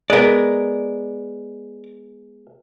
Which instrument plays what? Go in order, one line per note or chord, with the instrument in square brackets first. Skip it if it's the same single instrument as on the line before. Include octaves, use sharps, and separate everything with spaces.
[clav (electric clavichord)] G#3 B3 [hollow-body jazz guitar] A#4 D5